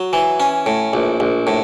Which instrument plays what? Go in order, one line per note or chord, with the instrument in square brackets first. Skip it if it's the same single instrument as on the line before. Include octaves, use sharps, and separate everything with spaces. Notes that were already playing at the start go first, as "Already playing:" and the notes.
Already playing: [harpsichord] F#3
E3
C#4
A2
A#1
A#1
A2